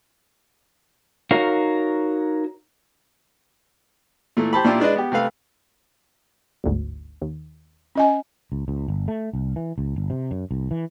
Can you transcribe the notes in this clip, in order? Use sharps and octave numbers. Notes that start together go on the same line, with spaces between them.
D#4 F#4 A#4 C#5 F5
A#2 E3 A3
G4 C5 A5 B5
A#2 D4 E4 F4 G4
G#3 D4 B4 D#5
B3 G4
C3 A3 B4 F5
G1 D2 G#2
D#2
C#4 D#5 G#5
C#2
C#2
G1
A3
C2
E3
C#2
G1
C3
F#2
C2
E3